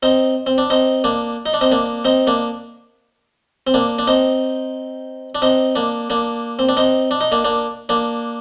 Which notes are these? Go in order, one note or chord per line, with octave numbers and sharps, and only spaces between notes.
C4 D#4
C4
D4
C4 D#4
A#3 D4
D#4
D4
C4 D#4
A#3 D4
C4 D#4
A#3 D4
C4
A#3 D4
D4
C4 D#4
D4
C4 D#4
A#3 D4
A#3 D4
C4
D4
C4 D#4
D4
D#4
A#3 D4
A#3 D4
A#3 D4